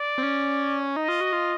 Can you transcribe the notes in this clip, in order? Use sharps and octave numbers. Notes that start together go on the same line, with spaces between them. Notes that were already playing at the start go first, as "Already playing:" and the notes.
Already playing: D5
C4
C#4
D#4 D#5
F4
F#4
F4